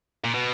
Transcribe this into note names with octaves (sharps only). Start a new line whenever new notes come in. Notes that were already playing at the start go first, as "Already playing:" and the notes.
A#2
B2